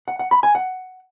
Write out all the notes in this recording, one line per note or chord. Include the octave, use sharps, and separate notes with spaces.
F#5
F#5
B5
G#5
F#5